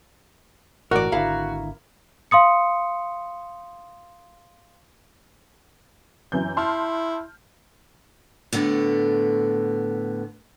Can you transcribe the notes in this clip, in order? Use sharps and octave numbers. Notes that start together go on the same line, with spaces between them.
G1 A2 E3 F#4 A#4 D5 D#5
G#1 D3 E4 F5 A#5
F5 C6 D#6 C#7
F#2 E3 G6
E4 A5 C6 F6
A2 D3 A3 B3